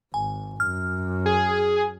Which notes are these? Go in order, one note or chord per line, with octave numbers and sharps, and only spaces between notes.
G#1 G#5
F#2 F6
G#4